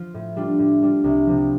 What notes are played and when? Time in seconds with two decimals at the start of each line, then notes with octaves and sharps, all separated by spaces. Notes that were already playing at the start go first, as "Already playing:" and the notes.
Already playing: F3 F4
0.14 A2
0.36 G3 D4 F4
0.59 A2
0.82 G3 D4 F4
1.04 C2
1.26 C3 F3